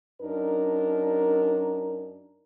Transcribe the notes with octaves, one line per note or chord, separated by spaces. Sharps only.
F#2 D4 D#4 A#4